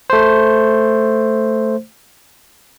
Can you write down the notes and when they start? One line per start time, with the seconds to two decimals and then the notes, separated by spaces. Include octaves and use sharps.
0.10 A3 C5